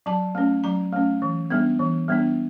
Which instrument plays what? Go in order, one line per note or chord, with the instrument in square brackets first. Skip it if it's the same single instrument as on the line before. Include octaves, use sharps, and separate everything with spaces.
[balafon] F#3 A5
A3 C#4
F#3 A#5
A3 C#4
E3
G3 B3 D4
E3
G3 B3 D4